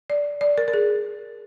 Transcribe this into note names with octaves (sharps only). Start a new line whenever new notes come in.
D5
D5
A#4
A#4
G#4